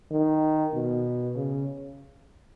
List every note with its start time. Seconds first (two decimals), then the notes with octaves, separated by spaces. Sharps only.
0.11 D#3
0.74 B2
1.36 C#3